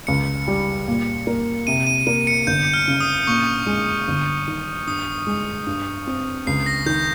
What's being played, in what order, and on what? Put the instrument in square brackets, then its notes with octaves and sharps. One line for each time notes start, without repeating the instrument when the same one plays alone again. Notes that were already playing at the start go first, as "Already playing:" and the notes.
[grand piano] C#2 [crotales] C#7
[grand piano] G3
A#2
A#3
[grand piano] C3 [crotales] D#7
[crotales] D#7
[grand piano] A#3 [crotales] D#7
[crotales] C#7
[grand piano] G1 [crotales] G6
[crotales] F6
[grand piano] C#3
[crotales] D#6
[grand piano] A#2 [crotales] C#6
[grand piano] G#3
G1
D#3
[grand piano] G2 [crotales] D#6
[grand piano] G#3
G2
C4
[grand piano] C#2 [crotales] C7
[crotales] A#6
[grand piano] D#3 [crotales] G6